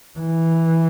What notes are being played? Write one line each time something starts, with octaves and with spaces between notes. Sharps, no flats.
E3